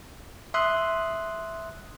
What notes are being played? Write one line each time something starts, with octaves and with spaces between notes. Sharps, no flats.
E5 C6 D#6 F#6